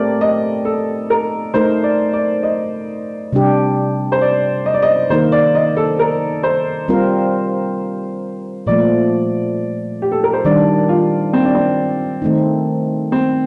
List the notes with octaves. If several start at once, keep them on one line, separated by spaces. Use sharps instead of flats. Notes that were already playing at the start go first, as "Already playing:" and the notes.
Already playing: A3 C4 G4 A#4 D5
D#5
A4
A#4
A3 D#4 A#4 C5
D5
D5
D#5
C3 G3 D4 G4
C5
D5
D#5
D5
D#5
D#3 A#3 D#4 A#4 C5
D5
D#5
A4
A#4
C5
G3 C4 F4 A#4
A#2 F3 A3 D5
G4
A4
A#4
C5
D#3 G3 D4 D5
F4
C4
D4
C4
D#3 A3 C4 D#4
C4